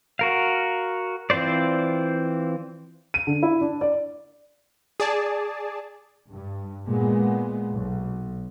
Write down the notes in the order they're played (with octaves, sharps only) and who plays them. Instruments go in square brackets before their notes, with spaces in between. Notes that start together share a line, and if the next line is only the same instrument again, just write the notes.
[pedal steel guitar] F#4 A#4 F5
E3 C4 F4 C5 D5
[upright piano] D#7
D3
E4
D4
D5
[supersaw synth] G#4 D5 A5
[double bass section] G2
A#2 G#3 B3
B1